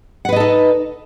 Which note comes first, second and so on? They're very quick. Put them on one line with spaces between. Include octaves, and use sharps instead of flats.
F#5 B4 D#5 A4 D#4